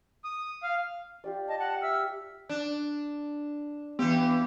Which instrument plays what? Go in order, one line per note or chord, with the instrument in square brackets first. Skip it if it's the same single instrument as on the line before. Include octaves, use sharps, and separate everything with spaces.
[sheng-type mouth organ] D#6
F5
[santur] F4 G4 D5
[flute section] D#5 A5
F#5 A5
E5 E6 F6
[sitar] D4
[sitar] E3 G4 [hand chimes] B3